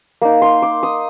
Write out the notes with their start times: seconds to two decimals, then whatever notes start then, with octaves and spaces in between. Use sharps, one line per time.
0.22 A#3 D#4
0.42 C6
0.62 D6
0.83 D#6